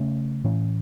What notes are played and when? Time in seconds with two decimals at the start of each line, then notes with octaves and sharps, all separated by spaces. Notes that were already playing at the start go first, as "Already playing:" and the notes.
Already playing: C#3 A3 C#4
0.44 A2 E3 C#4